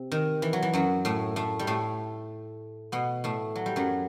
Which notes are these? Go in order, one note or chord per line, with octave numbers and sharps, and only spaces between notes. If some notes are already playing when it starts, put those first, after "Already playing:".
Already playing: C3 C4
D#3
E3
F#3
E3
F#2 F#3
A2 A3
A2 A3
G3
A2 A3
B2 B3
A2 A3
F#3
G3
F#2 F#3